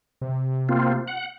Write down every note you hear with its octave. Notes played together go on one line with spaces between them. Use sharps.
C3
A#3 C4 F4
F#5